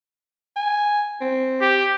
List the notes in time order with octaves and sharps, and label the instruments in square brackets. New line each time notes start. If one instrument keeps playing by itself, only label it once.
[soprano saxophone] G#5
C4
[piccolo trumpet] G4